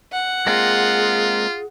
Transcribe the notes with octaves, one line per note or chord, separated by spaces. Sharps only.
F#5
G#3 A#3 C4 F4 G#4